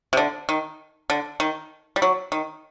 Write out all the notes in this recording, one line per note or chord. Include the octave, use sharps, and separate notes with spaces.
C3
D3
D#3
D3
D#3
G3
F#3
D#3